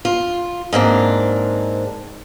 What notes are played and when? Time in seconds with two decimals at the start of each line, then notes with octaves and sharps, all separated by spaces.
0.05 F4
0.73 G#2 A#3 C4 D4